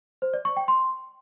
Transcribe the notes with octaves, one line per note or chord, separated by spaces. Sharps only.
C5
D5
C#6
G5
C6